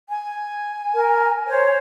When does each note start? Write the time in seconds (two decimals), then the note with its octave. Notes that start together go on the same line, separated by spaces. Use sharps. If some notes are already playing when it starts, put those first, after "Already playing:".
0.09 G#5
0.95 A#4
1.47 C5 C#5